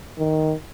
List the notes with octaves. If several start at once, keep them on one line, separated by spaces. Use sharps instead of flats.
D#3